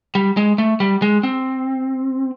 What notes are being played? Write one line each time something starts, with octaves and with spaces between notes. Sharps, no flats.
G3
G#3
A3
G3
G#3
C4